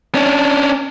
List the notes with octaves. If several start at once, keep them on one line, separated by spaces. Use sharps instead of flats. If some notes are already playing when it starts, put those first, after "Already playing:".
C#4 D4